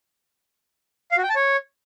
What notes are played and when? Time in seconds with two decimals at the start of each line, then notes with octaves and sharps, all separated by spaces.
1.11 F5
1.17 F#4
1.23 G5
1.29 A5
1.36 C#5